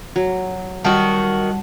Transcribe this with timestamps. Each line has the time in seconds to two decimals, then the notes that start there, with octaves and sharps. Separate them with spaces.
0.16 F#3
0.84 D#3 G3 F#4 F#5 A5